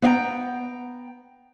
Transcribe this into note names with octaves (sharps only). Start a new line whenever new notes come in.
B3 E5 F5 G5 A#5